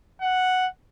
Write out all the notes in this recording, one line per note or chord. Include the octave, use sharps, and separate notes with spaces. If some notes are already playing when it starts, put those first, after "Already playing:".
F#5